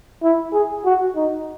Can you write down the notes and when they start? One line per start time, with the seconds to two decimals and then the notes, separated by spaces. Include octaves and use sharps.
0.23 E4
0.53 G#4
0.85 F#4
1.16 D#4